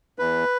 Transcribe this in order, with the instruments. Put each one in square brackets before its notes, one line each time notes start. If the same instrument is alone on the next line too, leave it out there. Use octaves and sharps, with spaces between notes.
[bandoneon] E2 B4